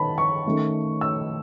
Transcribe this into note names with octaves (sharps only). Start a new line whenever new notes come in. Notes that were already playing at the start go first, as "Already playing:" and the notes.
Already playing: D#3 B3 A5 B5
C#6
D#3 A3 C#4
E6